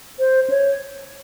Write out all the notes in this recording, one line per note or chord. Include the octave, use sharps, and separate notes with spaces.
C5
C#5